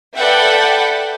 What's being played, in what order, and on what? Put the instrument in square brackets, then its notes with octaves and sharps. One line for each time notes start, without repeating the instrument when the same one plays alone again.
[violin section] A4 B4 D5 E5 F#5 G5